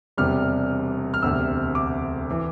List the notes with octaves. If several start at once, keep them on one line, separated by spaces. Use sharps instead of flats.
E1 E2 C3 G3 F6
F6
E1 D2 C3 E6
D6
E3